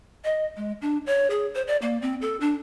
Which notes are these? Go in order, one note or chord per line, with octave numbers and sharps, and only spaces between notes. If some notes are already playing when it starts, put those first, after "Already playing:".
D#5
G#3
D4
C#5
G#4
C5
D5
A#3
C4
A4
D4